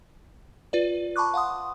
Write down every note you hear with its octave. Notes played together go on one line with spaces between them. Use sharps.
F4 B4 D5
A5 B5 C#6 D6 F#6
F5 F#5 C6 D#6